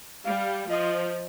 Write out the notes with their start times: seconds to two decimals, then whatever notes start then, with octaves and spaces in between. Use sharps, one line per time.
0.25 G3 F5
0.69 F3 D#5